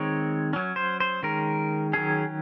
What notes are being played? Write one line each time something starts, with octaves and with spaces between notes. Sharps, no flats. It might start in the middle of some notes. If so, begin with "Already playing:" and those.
Already playing: D#3 G#3 C4 C#5
F#3 C#4
C5
C5
D#3 G#3 C#4 A#4
D#3 F#3 C#4 G#4